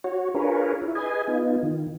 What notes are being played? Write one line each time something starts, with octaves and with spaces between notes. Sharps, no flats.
F#4 C#5
D4 F4 G#4 A#4 B4 C#5
E4
G#4 B4 D#5 G#5
B3 D#4 F4
D#3